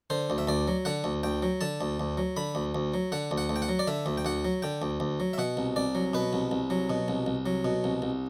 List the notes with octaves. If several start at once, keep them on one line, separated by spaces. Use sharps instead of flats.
D3 C5
D2
E5
D2 D5
F#3
D3 F#5
D2
D2 G5
F#3
D3 A5
D2
D2
F#3
D3 B5
D2
D2
F#3
D3 F#5
D2
F#5
D2
G5
F#5
F#3
D5
D3 E5
D2
G5
D2 F#5
F#3
D3 G5
D2
D2
F#3
E5
B2 F#5
C2
C2 D5
F#3
B2 B4
C2
C2
F#3
B2
C2
C2
F#3
B2
C2
C2